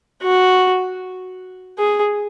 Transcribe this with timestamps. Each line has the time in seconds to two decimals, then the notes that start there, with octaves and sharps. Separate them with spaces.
0.23 F#4
1.78 G#4